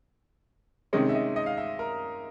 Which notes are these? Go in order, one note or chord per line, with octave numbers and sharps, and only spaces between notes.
C3 D#3 G#3 C#4 D#5
E5
D#5
D#5
F5
E5
A#4